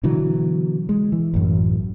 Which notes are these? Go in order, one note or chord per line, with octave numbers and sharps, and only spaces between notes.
B2 D3 E3 F#3
G#3
E3
A1 F#2